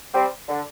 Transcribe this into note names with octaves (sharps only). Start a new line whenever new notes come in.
G3 C4
D3